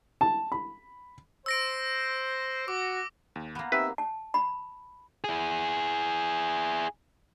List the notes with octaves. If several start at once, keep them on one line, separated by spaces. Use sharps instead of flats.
A5
B5
C5 E6 A#6 D7
F#4 D6
D#2
A#3 B3
C4 D#4 G4 B4 E5
A5
B5
E4 G#4